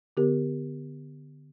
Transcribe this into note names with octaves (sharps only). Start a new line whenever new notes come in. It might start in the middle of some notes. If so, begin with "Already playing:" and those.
D3 B3 G4 A#4